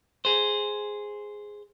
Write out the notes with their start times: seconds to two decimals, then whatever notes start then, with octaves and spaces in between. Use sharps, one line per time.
0.25 G#4 C5